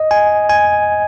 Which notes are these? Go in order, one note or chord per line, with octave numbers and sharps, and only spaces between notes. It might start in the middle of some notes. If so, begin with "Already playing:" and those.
Already playing: D#5
G#5
G#5